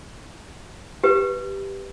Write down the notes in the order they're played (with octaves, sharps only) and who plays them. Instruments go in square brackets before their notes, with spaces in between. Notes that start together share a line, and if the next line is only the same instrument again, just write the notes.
[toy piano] G4 B4